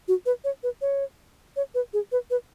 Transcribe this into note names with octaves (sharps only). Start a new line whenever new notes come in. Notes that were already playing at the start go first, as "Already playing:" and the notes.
F#4
B4
C#5
B4
C#5
C#5
B4
G#4
B4
B4